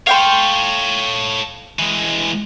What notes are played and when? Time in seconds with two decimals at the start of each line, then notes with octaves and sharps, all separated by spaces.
0.07 A4 C#5 F5 G5 C6
1.79 E3 G#3